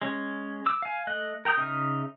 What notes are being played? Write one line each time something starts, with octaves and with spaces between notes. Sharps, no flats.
G#3 C#4
D6 E6
F5 G#5
A3 D#5 F#6
A#4 G5 A#5 D#6 G6
C#3 D#4 E5 D#6 F6